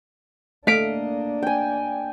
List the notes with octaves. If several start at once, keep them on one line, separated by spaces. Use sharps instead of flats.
A3 A#3 D4 D#5 F5 B6 D7
G5 G#5